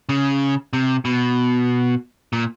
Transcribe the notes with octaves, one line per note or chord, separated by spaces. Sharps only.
C#3
C3
B2
A#2